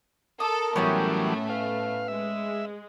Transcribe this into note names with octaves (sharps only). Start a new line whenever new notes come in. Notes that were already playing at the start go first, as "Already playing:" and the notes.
A4 A#4 D#6
A2 E3 F#3 G3 A3 B3 C#4 G5
B4 F5
G#3 E5